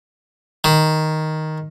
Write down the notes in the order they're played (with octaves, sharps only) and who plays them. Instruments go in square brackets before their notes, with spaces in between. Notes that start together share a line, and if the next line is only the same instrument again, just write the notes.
[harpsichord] D#3